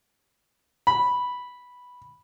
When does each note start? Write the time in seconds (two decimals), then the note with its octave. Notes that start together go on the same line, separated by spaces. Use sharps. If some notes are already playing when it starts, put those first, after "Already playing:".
0.87 B5